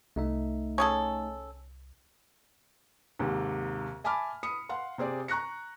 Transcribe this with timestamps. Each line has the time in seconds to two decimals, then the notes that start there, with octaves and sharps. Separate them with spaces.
0.16 C2 A3 D#4 E5
0.78 C#4 G#4 A4
3.19 D#2 G#2 C3
4.04 E5 G#5 A5 B5 D6 F6
4.43 B5 D#6 C#7
4.69 F5 F#5 C6
4.98 C3 C4 G#4 D5
5.28 A#5 C#6 F#6 A#6 C#7